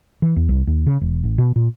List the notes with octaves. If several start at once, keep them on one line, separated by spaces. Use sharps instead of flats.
E3
E2
C2
D#2
C#3
E1
A1
B2
A#2